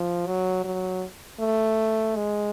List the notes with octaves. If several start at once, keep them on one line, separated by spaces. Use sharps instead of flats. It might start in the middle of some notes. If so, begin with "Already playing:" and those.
Already playing: F3
F#3
F#3
A3
G#3